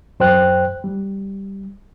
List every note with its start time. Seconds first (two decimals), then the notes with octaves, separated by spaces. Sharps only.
0.20 F#2 C5 G5 F#6
0.84 G3